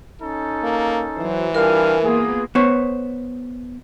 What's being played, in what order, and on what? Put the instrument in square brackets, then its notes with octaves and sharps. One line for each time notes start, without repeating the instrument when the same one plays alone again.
[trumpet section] C#4 D#4 A4
[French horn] A#3
[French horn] E3 [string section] F#3 C5
[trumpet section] G3 D4 F5 [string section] F4 G#5 [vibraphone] A#4
[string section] A#3 B3 F4 [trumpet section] G#4
[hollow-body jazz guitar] B3 C5 C#5